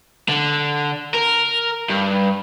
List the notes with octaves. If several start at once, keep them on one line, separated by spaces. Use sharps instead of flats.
D3
A#4
G2